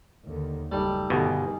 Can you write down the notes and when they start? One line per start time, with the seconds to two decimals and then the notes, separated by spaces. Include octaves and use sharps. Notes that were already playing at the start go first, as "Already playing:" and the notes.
0.25 D#2 D3
0.72 F#1 G3 A3 D#4 G4
1.10 G1 B2 D#3 G#4 A#5